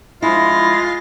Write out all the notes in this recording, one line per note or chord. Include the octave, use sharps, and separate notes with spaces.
F3 G#3 D4 E4 F4 B5 A#6